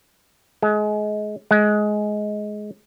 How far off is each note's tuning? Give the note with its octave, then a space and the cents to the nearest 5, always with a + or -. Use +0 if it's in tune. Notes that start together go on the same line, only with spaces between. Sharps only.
G#3 +25
G#3 +15